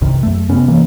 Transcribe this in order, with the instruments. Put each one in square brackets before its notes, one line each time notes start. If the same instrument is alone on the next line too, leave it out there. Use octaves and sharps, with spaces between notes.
[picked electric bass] C2 G2 C3 D#3
F#2 A3
G2 C3 B3 C#4
C3 E3 A#3